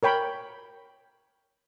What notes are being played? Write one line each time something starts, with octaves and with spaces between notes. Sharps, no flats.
A#4 C#5 G5 B5